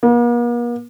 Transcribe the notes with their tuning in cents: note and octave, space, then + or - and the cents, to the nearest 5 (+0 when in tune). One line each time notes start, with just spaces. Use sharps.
A#3 +45